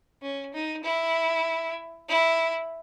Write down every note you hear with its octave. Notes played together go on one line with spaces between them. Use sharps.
C#4
D#4
E4
E4